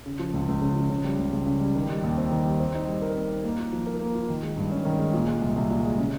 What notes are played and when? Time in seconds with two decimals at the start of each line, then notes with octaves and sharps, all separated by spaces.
0.06 C#3
0.19 F3
0.34 C#2
0.48 C#2
0.62 C#3
0.76 F3
0.90 C#3
1.04 G3
1.19 C#2
1.33 C#2
1.46 C#3
1.60 G3
1.75 D#3
1.89 G3
2.04 D#2
2.17 C4
2.31 D#3
2.45 G3
2.60 C4
2.74 D#4
2.88 G3
3.02 A#4
3.16 C4
3.30 D#4
3.44 A#3
3.58 F4
3.73 F3
3.86 A#4
4.01 A#3
4.15 F4
4.28 D#3
4.43 G#3
4.57 G2
4.71 C#4
4.85 D#3
4.99 G#3
5.14 A#2
5.28 G#3
5.42 C2
5.56 C2
5.70 A#2
5.84 G#3
5.98 C#3